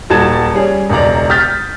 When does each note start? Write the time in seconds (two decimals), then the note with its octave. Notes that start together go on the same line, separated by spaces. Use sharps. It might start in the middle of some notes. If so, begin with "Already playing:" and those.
0.10 D#1 F#4 A5 G#6 E7
0.54 G3 C#4 G#4
0.89 E1 C#2 D5 A#5
1.30 D#6 F6 G6 A6 B6